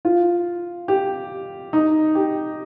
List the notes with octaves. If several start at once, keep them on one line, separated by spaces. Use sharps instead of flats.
F4
G4
D#4
G4